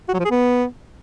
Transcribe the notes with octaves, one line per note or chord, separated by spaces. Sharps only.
F#4
F#3
F3
G#4
B3